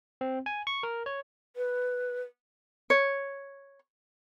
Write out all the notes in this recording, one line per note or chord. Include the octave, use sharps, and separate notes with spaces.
C4
G#5
C#6
A#4
C#5
B4
C#5